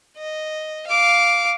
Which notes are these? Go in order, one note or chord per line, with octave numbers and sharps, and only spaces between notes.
D#5
F5 D6